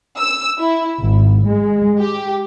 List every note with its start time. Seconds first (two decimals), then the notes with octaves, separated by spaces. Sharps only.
0.18 E6
0.59 E4
1.01 G#1
1.46 G#3
1.99 G4